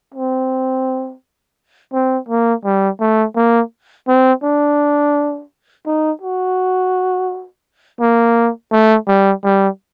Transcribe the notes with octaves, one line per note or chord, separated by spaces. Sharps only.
C4
C4
A#3
G3
A3
A#3
C4
D4
D#4
F#4
A#3
A3
G3
G3